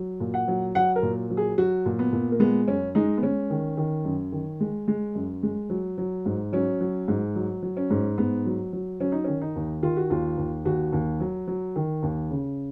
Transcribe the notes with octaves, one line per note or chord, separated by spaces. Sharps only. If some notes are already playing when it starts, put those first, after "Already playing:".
Already playing: F#3
A#2
F#5
F#3
F#3 F#5
A#4
A#2
F#3
G#4
F#3 F#4
A#2
B3
A#2
A#3
G#3 B3
F#2 C#4
G#3 D#4
B3
G#3 C#4
D#3
D#3
F#2
D#3
G#3
G#3
F#2
G#3
F#3
F#3
G#2
F#3 C#4
F#3
G#2
F#3
F#3
C#4
G#2
G#2 B3
F#3
F#3
F#3 C#4
D#4
D#3 C#4
D#4
D#2
D#3 F4
F#4
D#2 F4
D#2
D#2 F#4
D#2
F#3
F#3
D#3
D#2
C#3